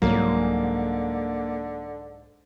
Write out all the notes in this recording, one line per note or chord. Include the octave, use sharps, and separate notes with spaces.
C2 G#2 D3 F#3 A#3